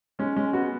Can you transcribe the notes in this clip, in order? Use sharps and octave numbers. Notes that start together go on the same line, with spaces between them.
G#3 C#4
G#3 C#4
B3 F#4